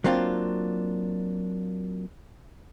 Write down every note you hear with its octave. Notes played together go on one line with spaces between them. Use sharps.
F#3 A#3 C4 D4 F4